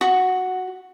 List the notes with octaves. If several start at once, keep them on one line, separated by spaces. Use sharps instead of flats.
F#4